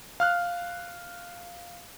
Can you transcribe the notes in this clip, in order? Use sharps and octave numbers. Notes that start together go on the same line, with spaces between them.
F5 F6 F#6